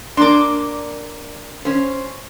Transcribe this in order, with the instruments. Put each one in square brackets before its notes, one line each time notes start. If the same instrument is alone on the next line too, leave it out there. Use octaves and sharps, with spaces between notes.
[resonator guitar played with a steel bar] A#3 D4 [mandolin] C6 D6
[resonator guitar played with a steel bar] C#4 C5